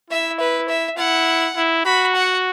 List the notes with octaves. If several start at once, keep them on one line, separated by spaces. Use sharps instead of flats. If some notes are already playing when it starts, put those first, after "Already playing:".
E4 E5
B4
E5
E4 F#5
E4
F#4 B5
F#5